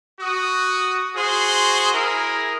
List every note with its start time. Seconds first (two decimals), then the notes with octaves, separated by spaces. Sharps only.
0.20 F#4 D#6
1.16 F#4 G#4 C5 C6
1.93 E4 G#4 A#4